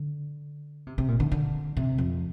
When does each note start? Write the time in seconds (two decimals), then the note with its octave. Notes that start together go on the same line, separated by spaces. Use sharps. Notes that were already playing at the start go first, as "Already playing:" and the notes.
Already playing: D3
0.87 C3
0.98 C3
1.08 A#2
1.20 D3
1.32 D3
1.77 C3
1.98 F2